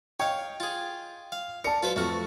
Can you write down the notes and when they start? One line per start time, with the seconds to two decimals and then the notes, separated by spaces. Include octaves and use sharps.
0.20 C#5 D#5 F5 G5 C#7
0.60 F4 G#4
1.32 F5
1.64 A#4 D5 A5 C#7
1.83 F#3 F4 B4 C5
1.96 F2 A3 F#4 F6